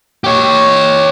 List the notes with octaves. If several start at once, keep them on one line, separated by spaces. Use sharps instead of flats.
G4 C#5